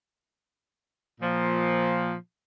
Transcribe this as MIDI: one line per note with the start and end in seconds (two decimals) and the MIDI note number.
1.21 2.13 46
1.21 2.13 53